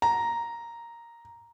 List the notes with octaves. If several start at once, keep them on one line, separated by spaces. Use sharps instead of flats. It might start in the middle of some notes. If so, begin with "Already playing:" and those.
A#5